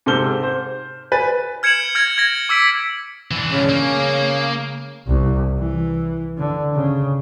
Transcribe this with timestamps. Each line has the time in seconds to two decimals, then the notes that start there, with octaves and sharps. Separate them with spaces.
0.06 G#2 C3 A4 C5 F6 G7
0.43 C5
1.12 B4 G#5 A6
1.63 F6 G#6 C#7 D7 E7 F#7
1.95 F6 G#6 A#6
2.18 G#6 A#6
2.49 D6 E6 B6 D7
3.31 E3 D4
3.51 C#3
3.69 A#3
5.07 C2
5.59 E3
6.38 D3
6.75 C#3